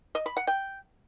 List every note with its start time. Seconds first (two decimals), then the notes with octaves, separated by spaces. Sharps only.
0.15 D#5
0.26 B5
0.37 F#5
0.47 G5